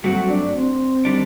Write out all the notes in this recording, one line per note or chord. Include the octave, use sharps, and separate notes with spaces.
G2 F#3 A3 C4 F#4
D4
C4
D#3 G3 D4